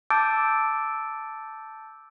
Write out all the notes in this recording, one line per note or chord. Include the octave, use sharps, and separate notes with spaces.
A5 D6 E6 G6 A6 D7